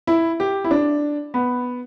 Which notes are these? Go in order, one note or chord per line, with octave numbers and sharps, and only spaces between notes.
E4
G4
E4
D4
B3